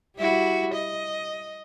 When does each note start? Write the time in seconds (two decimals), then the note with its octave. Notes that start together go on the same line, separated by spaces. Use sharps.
0.17 G3 E4 F#4
0.74 D#5